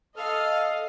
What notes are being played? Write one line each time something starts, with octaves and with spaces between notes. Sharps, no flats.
A4 D#5 F5 F6